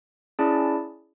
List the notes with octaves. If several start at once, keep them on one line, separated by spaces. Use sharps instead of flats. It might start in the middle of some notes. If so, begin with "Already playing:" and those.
C#4 E4 G#4 D5 A5